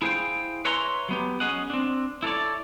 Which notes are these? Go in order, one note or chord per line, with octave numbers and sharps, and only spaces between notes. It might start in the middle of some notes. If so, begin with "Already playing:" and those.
E4 G#4 C5 F5 G5
B4 C#5 E5 G#5 A#5 C6
F#3 B3 G4
C#4 G#4 D#5 F#5
C4 D4
E4 A4 A#4 C#5 D5